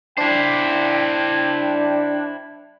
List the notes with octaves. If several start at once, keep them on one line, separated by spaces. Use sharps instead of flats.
D4 E4 C5 G5